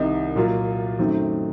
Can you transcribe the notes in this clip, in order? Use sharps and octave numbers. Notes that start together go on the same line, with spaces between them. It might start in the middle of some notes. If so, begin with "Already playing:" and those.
Already playing: C2 C3 D#3 D#5
A#2 F#3 A#3 F4
F#2 D#3 F#3 A3 C4